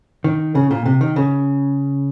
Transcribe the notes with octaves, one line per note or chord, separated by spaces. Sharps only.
D#3
C#3
A#2
C3
D#3
C#3